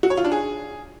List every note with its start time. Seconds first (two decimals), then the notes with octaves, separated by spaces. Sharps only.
0.03 F#4
0.10 C#5
0.17 F4
0.25 D4
0.32 G#4